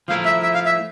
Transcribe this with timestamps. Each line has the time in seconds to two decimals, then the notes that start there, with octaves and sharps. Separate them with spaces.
0.08 F3 A3 E4 A#4 F5
0.25 E5
0.43 E5
0.54 F5
0.66 E5